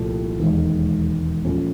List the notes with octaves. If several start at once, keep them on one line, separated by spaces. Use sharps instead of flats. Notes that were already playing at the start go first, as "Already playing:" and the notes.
Already playing: C2 A#2 F3 A3
E1 D#2 D#3 G#3
A#2 F3 A3 C#4